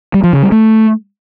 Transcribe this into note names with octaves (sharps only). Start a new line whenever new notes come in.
G3
F3
C#3
G3
A3